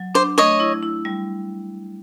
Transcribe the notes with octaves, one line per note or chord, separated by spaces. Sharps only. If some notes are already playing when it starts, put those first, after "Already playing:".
Already playing: F#3
D4 C5
A3 C#5 D#5
E4
E4
G3